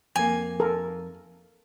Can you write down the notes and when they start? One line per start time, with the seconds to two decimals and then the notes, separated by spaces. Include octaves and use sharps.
0.16 F2 A#3 G#5
0.60 A4 A#4